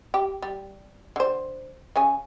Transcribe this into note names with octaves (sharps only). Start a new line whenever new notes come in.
G4
G3
D3 C5
C#3 C#4 G#5